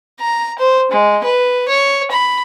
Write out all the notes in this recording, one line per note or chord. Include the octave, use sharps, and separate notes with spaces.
A#5
C5
G#3
B4
C#5
B5